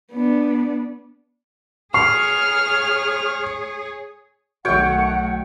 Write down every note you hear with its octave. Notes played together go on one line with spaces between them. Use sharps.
B3 D4
G#4 C#5 C#6 F6 C7
B1 D#3 A3 F#4 C#5 E5 F#5 G5